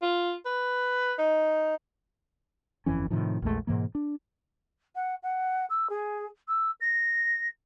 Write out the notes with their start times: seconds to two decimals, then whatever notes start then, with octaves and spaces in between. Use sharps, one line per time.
0.02 F4
0.46 B4
1.18 D#4
2.86 G1 F2 E3 C#4
3.10 A2 C3 D#3 F3
3.42 A#1 E2 G#3 A3
3.67 G#2 B2 E3 A#3
3.95 D4
4.95 F#5
5.23 F#5
5.69 E6
5.89 G#4
6.48 E6
6.80 A#6